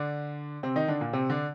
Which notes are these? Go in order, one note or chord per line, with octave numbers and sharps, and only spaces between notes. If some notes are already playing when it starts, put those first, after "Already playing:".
Already playing: D3 D4
C3 C4
D#3 D#4
D3 D4
A#2 A#3
C3 C4
D3 D4